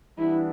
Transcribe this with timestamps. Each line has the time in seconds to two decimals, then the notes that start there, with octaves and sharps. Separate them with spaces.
0.18 E3 G3 B3 D4 E4